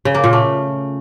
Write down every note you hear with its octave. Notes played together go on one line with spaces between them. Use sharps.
C#3
A#3
A#2
A3